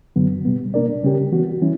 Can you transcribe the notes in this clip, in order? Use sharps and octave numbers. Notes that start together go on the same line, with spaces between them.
F#2 D3 F#3 B3
B2 G3 B3
B2 A#3 D4 A#4 D5
C#3 G3 C#4 G4 A#4
E3 B3 F#4
E3 G3 C#4 E4